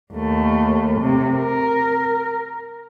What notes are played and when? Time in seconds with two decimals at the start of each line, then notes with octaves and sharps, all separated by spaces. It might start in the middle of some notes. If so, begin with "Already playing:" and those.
0.14 D#2 A3
1.01 C3
1.36 A#4